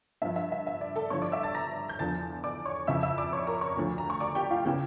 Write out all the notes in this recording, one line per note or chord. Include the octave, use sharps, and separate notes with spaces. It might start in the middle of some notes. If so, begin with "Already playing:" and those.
G2 F3 E5
E5
E5
E5
D5
A4 A5
G2 D3 F3 C#5 C#6
D5 D6
E5 E6
A5 A6
A#5 A#6
G6
E2 D3 F3 A5 A6
D5 D6
C#5 C#6
F2 C#3 E3 E5 E6
E5 E6
D5 D6
C#5 C#6
A#4 A#5
C#5 C#6
D2 D3 F3
A#5
C#6
D5 D6
G4 G5
F4 F5
C#3 E3 G4 G5